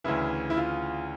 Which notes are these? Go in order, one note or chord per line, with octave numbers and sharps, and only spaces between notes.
D2 C#3 E3 E4
E4
F4